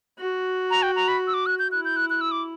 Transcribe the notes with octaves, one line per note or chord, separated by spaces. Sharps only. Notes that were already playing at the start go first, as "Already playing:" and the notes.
F#4
A#5
G5
A#5
B5
E6
D6
F#6
G6
E4 F#6
G6
F#6
F#6
E6
D6